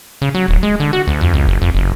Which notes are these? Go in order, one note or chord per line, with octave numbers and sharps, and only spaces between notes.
C#3
F#3
D1
G#3
D3
F#4
D2
F2
C#2
F#1
F2
F#1